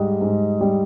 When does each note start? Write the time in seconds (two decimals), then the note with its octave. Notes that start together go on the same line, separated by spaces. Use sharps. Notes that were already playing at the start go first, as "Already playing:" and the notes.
Already playing: G#2 G3 D#5
0.21 G#2
0.61 G3